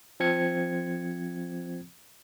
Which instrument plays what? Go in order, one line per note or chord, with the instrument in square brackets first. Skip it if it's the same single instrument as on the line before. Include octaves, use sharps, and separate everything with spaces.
[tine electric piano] F3 C4 G#6 C#7